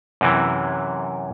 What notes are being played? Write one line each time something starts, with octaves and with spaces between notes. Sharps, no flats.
F#2 C3 E3